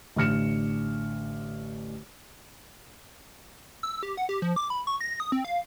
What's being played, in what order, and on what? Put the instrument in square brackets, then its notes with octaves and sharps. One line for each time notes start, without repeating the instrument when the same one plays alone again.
[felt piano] A1 D3 F6 C#7 E7
[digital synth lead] E6
G4
F#5
G4
F3
D6
B5
C#6
A#6
D#6
C4
F5